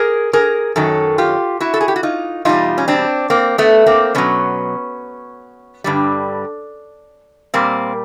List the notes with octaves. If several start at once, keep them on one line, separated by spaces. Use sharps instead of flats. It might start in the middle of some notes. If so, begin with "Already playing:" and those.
Already playing: G#4 A#4
G#4 A#4
F#2 D#3 F#3 A4
F4 G4
E4 F#4
A4
G#4
G4
F#4
D#4 F4
E2 B2 G3 D#4 F4
C#4
C4 D4
A#3 C4
A3 B3
A#3 C4
B2 F#3 B3 C#4
G2 D3 G3
A#2 G3 A#3 C4